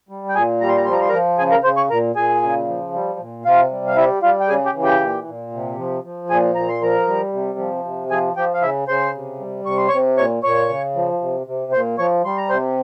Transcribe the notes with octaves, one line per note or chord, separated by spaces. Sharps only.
G3
G5
A#2 G#4 G#5
G3 A#5
C6
A#5
F3 C6
A#5
C6
F3 A#4 A#5
C#3 G#4 G#5
A#4 A#5
C#3 C5 C6
C#5 C#6
A#2 A#4 A#5
A#2 G#4 G#5
C#3
F3
G3
A#2
C3 F4 F5
G3
F5
G3 E4 E5
G3 F4 F5
G5
C#3 G#4 G#5
G4 G5
E3
G4 G5
A#2
A#2
C3
F3
F3
A#2 G#4 G#5
A#2 A#5
C6
F3 A#4 A#5
G3
C3
F3
C3
F3 G#4 G#5
F3 G4 G5
F5
C#3 E4 E5
C#3 C5 C6
C3
G3
C3 C#6
C6
C3 C#5 C#6
A#2 C#5 C#6
A#2 C#5 C#6
C#3
F3
C3
C3
A#2 C5 C6
F3 C#5 C#6
G3 C6
A#5
C3 C5 C6